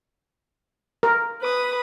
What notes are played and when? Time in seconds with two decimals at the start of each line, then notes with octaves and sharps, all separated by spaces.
1.03 A#4
1.43 B4 D#6